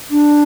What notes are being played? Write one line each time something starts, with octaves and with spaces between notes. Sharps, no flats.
D4